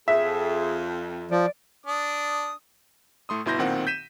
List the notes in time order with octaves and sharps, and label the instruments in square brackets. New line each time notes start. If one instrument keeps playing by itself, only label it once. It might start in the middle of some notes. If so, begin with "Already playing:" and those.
[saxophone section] F2 [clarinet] G#4 [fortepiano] E5
[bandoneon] F3 [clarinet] D5
[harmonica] D4 D#6
[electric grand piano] A2 A3 C6 D#6
G1 B2 E4 C6 G6 A#6
B1 A#2 D#3 C4 F#5
G6 B6 D#7 E7